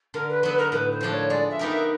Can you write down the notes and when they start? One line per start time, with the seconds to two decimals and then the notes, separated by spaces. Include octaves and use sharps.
0.14 D3 A#4
0.29 B4
0.43 F#3 B3 B4
0.57 A#4
0.72 A2 B4
0.91 C5
1.01 F3 A3 D4
1.11 C#5
1.29 G#3 D5
1.50 E5
1.59 B3 D#4 G4 A#4
1.69 E5